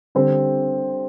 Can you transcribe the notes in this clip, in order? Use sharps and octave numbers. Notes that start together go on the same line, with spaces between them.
D3 G3 C4 G4 C5